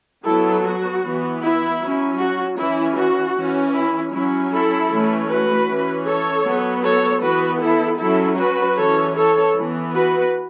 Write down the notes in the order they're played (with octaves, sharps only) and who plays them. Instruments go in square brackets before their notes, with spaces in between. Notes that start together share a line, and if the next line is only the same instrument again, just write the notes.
[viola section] F#3 B3 E4 A4
F#4
E3 B3
E4
F#3 C#4
F#4
E3 C#4 E4
F#4
E3 C#4
E4
F#3 C#4 E4
E4 A4
E3 A3 C#4
F#4 B4
E3 C#4
A4 C#5
F#3 B3
A4 C#5
E3 B3 F#4 B4
E4 A4
F#3 C#4 E4 A4
F#4 B4
E3 C#4 A4 C#5
A4 C#5
E3
B3
F#4 B4